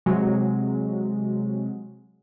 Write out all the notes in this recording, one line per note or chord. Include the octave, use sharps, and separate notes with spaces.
C3 F#3 G#3